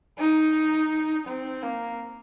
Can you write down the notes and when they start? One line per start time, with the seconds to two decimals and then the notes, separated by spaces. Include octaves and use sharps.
0.18 D#4
1.27 C4
1.63 A#3